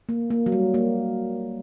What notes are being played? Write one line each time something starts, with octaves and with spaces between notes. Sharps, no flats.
A#3
A#3
F#3
G3
A#3